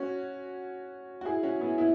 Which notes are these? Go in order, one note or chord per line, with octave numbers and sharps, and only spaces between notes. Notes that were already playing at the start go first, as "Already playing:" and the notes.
Already playing: C#4 F#4
F#4
E4 G#4
C#4 F#4
B3 E4
B3 E4